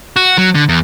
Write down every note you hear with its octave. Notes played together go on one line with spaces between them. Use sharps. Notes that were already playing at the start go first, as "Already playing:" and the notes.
F#4
F#3
D3
E2